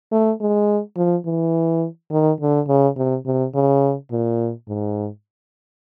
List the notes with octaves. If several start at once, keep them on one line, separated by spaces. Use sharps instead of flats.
A3
G#3
F3
E3
D#3
D3
C#3
C3
C3
C#3
A#2
G#2